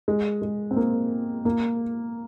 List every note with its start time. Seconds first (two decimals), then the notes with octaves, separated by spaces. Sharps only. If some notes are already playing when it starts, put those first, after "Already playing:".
0.08 G#3
0.42 G#3
0.71 C4
0.76 A#3
1.45 A#3